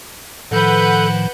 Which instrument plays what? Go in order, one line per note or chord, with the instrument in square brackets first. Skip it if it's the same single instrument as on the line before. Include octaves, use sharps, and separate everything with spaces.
[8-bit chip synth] A2 D#3 F3 [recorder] A4 [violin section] B4 F#5 G6